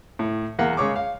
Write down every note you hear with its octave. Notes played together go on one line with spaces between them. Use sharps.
A2
E2 A#3 F#5
C#3 G#3 C#5 C#6 D6
F5